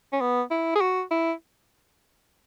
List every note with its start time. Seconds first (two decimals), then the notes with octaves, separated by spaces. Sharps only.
0.13 C#4
0.21 B3
0.51 E4
0.76 G#4
0.81 F#4
1.11 E4